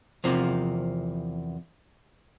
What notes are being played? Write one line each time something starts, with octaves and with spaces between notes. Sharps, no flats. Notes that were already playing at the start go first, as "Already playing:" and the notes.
E2 C3 F3 A#3